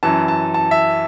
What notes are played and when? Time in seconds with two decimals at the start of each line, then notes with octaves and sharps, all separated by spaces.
0.03 F#2 E3 A5
0.28 A5
0.54 A5
0.71 E5